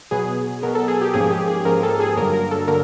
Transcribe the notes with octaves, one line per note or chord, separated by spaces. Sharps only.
B2 F#3 B3 G#4
B2 F#3 B3 A#4
A4
G#4
G4
G#2 F3 A#3 C#4 G#4
G4
G#4
G#2 F3 A#3 C#4 A#4
A4
G#4
G2 D3 F#3 A#3 A#4
A#4
A4
D3 F#3 A#3 A#4